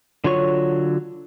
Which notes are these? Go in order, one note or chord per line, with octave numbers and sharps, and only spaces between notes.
D3 F#3 F4 C#5 C#6